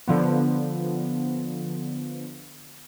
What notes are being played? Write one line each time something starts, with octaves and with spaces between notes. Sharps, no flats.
D3 F3 B3